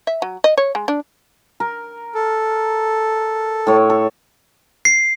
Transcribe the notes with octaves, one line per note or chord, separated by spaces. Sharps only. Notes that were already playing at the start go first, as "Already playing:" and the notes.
E5
F#3
D#5
C#5
G#3
D4
A#4
A4
A2 C#5
A4
C7